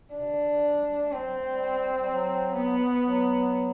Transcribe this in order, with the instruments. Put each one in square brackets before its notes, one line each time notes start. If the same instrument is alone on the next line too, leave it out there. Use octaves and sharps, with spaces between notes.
[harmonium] C3 [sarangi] D4
[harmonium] D3
D3
D3
E3
G3
G3
A3
[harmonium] G3 [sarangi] C4
[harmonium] F#3
A3
G3
G3
F#3
[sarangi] B3
[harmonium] F#3